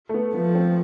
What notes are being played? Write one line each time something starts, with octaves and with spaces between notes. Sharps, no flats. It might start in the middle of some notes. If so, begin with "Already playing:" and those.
A3
B3
F3 B3
C4